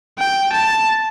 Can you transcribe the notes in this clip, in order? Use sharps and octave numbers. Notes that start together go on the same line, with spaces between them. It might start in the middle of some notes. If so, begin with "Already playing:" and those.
G5
A5